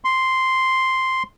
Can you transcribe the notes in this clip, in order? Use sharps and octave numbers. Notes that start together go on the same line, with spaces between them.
C6